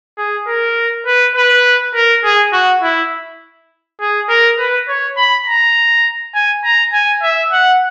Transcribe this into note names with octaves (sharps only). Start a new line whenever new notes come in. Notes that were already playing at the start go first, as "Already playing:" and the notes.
G#4
A#4
B4
B4
A#4
G#4
F#4
E4
G#4
A#4
B4
C#5
B5
A#5
G#5
A#5
G#5
E5
F#5